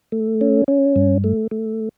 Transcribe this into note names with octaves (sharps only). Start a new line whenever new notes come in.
A3
C#4
C#4
G2
A3
A3